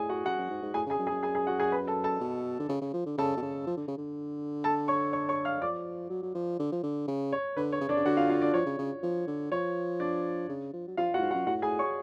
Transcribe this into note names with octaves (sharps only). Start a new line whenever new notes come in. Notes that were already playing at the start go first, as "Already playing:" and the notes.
Already playing: A2 G#4 G#5
F#4 F#5
F#2 F#4 F#5
F#2
G#2
G#2
A2 G#4 G#5
C#3 G#4 G#5
F#2
G#4 G#5
F#2
G#4 G#5
G#4 G#5
F#4 F#5
G#4 G#5
B4 B5
A4 A5
A4 A5
B2
D3
C#3
C#3
F3
D3
C#3 A4 A5
B2
C#3
F3
D3
C#3
D3
A4 A5
C#5 C#6
C#5 C#6
C#5 C#6
F5 F6
F3 D5 D6
F#3
F#3
F3
D3
F3
D3
C#3
C#5
D3 B4
C#5
C#3
D3 D4 D5
C#3
D3 F#4 F#5
F4 F5
F4 F5
D4 D5
F3 C#5
C#3
C#3
F3
D3
F3 C#5
D4 D5
C#3
F3
F#3
F3 F4 F5
F#4 F#5
A2
G#2
F#4 F#5
F#2
A2 F#4 F#5
A2 G#4 G#5
C#5 C#6